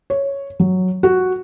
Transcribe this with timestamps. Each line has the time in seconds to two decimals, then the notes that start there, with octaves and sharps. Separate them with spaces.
0.10 C#5
0.60 F#3
1.03 F#4